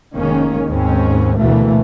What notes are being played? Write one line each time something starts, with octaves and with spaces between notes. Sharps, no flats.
F1 D#3 G#3 A#3 C#4
D#2 G#2 G#3 C4 C#4
D2 B2 E3 A3 A#3